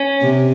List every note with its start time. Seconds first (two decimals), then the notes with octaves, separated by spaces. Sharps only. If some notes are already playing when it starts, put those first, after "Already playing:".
Already playing: C#4
0.22 C3